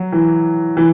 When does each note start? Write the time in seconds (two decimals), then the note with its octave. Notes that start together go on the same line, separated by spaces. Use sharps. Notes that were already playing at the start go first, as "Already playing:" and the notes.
Already playing: F#3
0.12 E3
0.77 E3